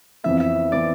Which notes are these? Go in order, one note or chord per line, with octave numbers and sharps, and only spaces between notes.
F2 E3 B3 E5
E5
E3 B3 D5